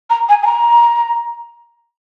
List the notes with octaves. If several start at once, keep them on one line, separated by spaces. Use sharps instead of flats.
A#5
G#5
G#5
A#5